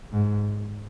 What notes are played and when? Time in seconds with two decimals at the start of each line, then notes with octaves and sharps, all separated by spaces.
0.13 G#2